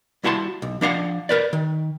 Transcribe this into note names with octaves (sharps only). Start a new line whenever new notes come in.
G3 E4 F#4 A5 C6
B1
F3 D4 F5 F#5
A#4 B4 D5
D#3